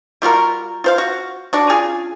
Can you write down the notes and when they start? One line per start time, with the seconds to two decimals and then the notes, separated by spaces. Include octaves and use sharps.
0.22 G3 F4 F#4 A#4
0.84 F4 C5 F5
0.98 F#4
1.53 D4 F#4 D5
1.69 C#3 F4 G#4 G#5